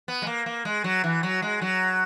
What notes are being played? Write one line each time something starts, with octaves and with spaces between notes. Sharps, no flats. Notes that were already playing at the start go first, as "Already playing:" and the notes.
B3
G#3
A#3
A#3
G#3
F#3
E3
F#3
G#3
F#3